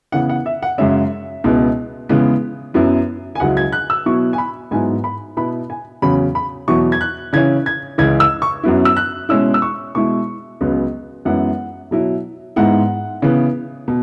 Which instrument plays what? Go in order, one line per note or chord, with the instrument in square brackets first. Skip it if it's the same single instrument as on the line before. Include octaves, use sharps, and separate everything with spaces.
[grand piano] C#3 E3 B3 F#5
F#5
E5
F#5
F#2 C#3 G#3 C#4 E5
C#2 B2 B3 E4
C#3 E3 G#3 B3
F#2 F#3 B3 E4
G#5
C#2 C#3 F#3 E4 F#5
G#6
F#6
E6
B2 F#3 B3 E4 C#6
G#5
B5
G#2 F#3 B3 E4 G#5
B5
B2 B3 E4 B5
G#5
E2 C#3 F#3 C#4 B5
B5
E2 B2 F#3 B3 E4 C#6
G#6
F#6
C#3 E3 C#4 G#6
G#6
C#2 C#3 E3 G#6
E6
C#6
F#2 F#3 B3 E4
E6
F#6
B2 G#3 C#4 E4 E6
E6
C#6
B2 G#3 E4 C#6
C#2 C#3 F#3 B3
F#2 E3 G#3 B3 E4 F#5
B2 F#3 E4
G#2 G#3 B3 E4 F#5
C#3 E3 B3
B2